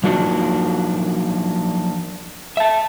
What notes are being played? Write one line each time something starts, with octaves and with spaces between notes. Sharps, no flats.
F3 F#3 A#3 D4 D#4 F#4
E5 A5